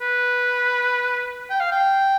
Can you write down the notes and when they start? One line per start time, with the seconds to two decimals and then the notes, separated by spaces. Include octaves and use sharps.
0.01 B4
1.50 G5
1.60 F5
1.72 G5